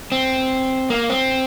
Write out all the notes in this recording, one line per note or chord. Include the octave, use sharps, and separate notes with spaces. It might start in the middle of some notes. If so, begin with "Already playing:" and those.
C4
A#3
C4